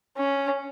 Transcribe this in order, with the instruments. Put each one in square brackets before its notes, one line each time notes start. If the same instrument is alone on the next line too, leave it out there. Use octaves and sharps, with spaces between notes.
[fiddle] C#4